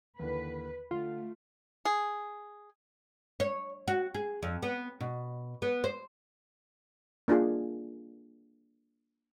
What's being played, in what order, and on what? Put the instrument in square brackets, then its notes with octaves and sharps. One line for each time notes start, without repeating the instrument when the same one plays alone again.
[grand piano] D#2 D3 E3 [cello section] B4
[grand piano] D3 [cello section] A3 [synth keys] F4
[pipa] G#4
[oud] C#5
F#4
G#4
F2
B3
B2
B3
C5
[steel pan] A#3 D4 F4 G#4